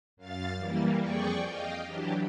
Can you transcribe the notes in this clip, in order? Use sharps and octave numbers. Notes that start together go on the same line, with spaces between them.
F#2 F5 A6
E3 G3 A#3
F2 G#4 D5 G5 C#6
D#5 F5 G5
E3 F#3 D4 G4